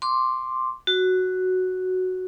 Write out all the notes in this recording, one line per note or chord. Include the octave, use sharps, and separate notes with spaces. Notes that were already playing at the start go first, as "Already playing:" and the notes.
C6 D6
F#4